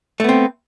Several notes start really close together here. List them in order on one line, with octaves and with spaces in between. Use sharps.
A3 B3 C4